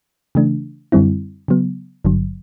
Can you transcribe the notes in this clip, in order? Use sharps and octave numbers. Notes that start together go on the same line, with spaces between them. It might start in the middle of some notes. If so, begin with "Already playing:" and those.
C#3 E3 A3 D4
F#2 D3 G3 C4 E4
C#3 F#3 B3
G#1 G2 D3 F#3